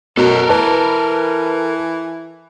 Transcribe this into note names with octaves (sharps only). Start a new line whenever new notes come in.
F#2 B2 A4 A#4
E3 B4 A5